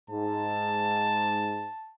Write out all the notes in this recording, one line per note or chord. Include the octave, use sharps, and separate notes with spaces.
G#2 A5